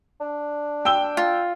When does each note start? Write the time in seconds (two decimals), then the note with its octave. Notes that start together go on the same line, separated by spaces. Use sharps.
0.20 D4
0.85 G5 E6 G7
1.17 F4